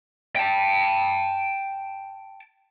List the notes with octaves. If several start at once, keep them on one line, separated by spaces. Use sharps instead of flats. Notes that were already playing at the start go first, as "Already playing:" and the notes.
G5 A5